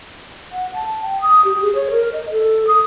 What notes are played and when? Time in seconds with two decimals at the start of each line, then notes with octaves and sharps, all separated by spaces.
0.52 F#5
0.74 A5
1.01 G5
1.21 D#6
1.45 G4
1.62 G#4
1.75 C#5
1.91 A#4
2.13 D#5
2.31 A4
2.67 D#6